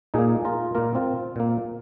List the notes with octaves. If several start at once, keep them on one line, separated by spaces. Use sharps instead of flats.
A#2 A#3 D#4 G#4
F4 A#4
A#2 A#3 F4 A#4
C4 F4
A#2 A#3